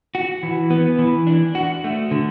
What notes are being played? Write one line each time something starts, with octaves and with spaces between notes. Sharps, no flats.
F#4
E3
B3
E3
D4
F#4
A3
D3